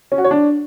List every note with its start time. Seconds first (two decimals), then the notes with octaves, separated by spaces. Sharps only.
0.12 C#4
0.18 F#4
0.24 C#5
0.31 D4